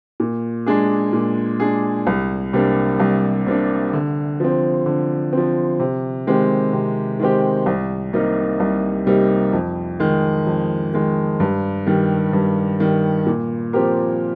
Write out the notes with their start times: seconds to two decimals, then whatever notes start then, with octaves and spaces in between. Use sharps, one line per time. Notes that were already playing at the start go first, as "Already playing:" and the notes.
0.20 A#2
0.66 G#3 D4 G#4
1.13 A#2
1.60 G#3 D4 G#4
2.07 C2
2.53 C3 G3 A#3 D4
3.00 C2
3.47 C3 G3 A#3 D4
3.93 D3
4.40 F3 C4
4.86 D3
5.33 F3 C4
5.80 C3
6.27 D#3 G#3 C4 G4
6.73 C3
7.20 D#3 G#3 C4 G4
7.66 C2
8.13 C3 G3 A#3 D#4
8.60 C2
9.07 C3 G3 A#3 D#4
9.53 F2
10.00 D#3 G#3
10.47 F2
10.94 D#3 G#3
11.40 G2
11.87 D#3 G3
12.33 G2
12.80 D#3 G3
13.27 A#2
13.73 F3 C4 G4 A#4